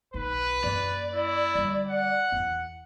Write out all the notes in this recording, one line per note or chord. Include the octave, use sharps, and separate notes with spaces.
B1 D#3 B4
F#2 A#3 D5
E4
D3 G3
F#5
E2 E4